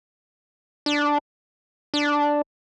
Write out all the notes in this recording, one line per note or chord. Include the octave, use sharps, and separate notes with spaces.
D4
D4